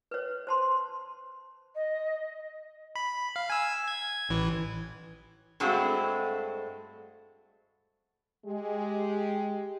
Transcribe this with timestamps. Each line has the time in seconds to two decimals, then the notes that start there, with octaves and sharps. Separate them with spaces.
0.11 B4 C#5
0.47 C5 A5 C6
1.75 D#5
2.95 B5
3.36 F5
3.50 G#5 E6
3.88 G#6
4.29 A1 E3
5.60 G2 G#3 A3 C4 F#4
8.45 G#3 G4